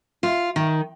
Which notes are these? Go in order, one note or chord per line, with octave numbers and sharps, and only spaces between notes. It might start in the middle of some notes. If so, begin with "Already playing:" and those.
F4
D#3